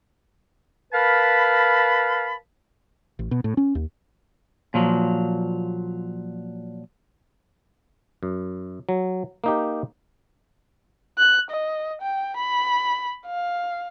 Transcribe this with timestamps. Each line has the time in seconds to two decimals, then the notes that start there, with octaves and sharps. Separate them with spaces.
0.93 A#4 B4 F5 A5 B5
3.19 A1
3.31 B2
3.44 A2
3.57 C#4
3.75 D#2
4.74 A#2 F3 F#3
8.23 F#2
8.89 F#3
9.44 A#3 D#4 G4
11.18 F#6
11.51 D#5
12.02 G5
12.37 B5
13.26 F5